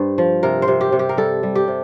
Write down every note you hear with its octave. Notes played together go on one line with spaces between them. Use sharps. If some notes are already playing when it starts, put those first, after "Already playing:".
Already playing: G2 C5
F3
C3 A#4
C5
C3
G4
C3
G4
A#4
G3 A4
G3
G4
C3